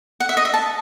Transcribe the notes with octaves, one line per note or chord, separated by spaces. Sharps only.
F#5
E5
D#5
E5
A5